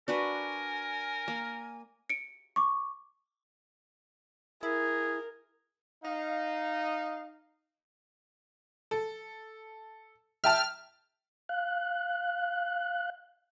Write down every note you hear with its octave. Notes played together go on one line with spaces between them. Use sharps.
D4 F#4 A#4 B4 G#5
A#3
C#7 D7
C#6 D6
E4 G#4 A#4
D#4 F5
A4
E5 G5 A5 F6
F5 F#6